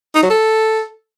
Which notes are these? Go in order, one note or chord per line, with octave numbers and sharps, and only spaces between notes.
D#4
F#3
A4